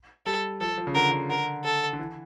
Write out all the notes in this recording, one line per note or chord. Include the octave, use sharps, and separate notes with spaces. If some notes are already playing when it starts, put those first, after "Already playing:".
G3 A4
F3 A4
F3
C#3
D3 A#4
D3
D3 A#4
A4
D3
E3